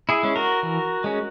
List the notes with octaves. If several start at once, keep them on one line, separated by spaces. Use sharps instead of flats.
E4 G#4
G#3 C#4
F#4 A#4
E3
G#3 C#4